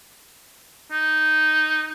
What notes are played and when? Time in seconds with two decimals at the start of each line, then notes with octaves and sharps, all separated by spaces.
0.92 D#4